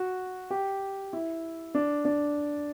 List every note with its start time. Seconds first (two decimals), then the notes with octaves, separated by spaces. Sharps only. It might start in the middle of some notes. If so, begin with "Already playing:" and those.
Already playing: F#4
0.50 G4
1.13 E4
1.75 D4
2.05 D4